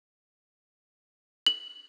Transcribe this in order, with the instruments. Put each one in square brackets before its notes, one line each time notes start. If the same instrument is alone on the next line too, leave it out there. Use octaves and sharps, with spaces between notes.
[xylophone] F#7